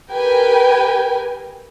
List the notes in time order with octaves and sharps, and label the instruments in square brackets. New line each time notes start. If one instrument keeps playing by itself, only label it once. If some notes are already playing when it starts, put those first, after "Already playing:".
[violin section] G4 A#4 B4 G5 G#5